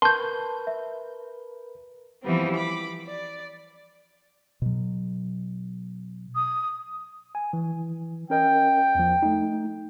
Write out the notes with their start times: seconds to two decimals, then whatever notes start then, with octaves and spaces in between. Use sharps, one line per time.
0.02 A#4 B4 A5 C6 C#6 G6
0.67 E5
2.23 E3 F3 G3 B3 C4
2.54 B5 D6
3.06 D5
4.62 B2 F#3
6.35 D#6
7.35 G#5
7.53 E3
8.30 C#4 A#4 D#5 G5
8.95 E2 F3
9.23 A3 D#4